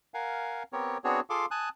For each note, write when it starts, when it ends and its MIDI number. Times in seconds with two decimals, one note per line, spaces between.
0.14 0.63 70
0.14 0.63 77
0.14 0.63 78
0.14 0.63 80
0.73 0.98 59
0.73 0.98 60
0.73 0.98 67
0.73 0.98 70
0.73 0.98 73
1.04 1.20 59
1.04 1.20 60
1.04 1.20 62
1.04 1.20 66
1.04 1.20 68
1.04 1.20 73
1.30 1.46 65
1.30 1.46 68
1.30 1.46 69
1.30 1.46 77
1.30 1.46 84
1.30 1.46 86
1.51 1.69 80
1.51 1.69 81
1.51 1.69 87
1.51 1.69 90